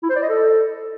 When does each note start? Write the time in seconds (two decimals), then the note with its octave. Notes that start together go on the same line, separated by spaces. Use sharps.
0.03 E4
0.10 C5
0.16 D5
0.23 D#5
0.29 A4